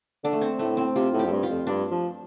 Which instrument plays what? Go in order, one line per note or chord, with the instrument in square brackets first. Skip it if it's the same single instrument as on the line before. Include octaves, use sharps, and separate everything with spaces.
[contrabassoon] D3 [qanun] D4
[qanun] A3
C4
[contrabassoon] A2 [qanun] A3
[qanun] C4
[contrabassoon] C3 [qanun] F4
[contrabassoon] A2
[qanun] G4
[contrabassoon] F2
G2
[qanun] F4
[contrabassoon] F2
[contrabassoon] G2 [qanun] D4
[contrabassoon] F3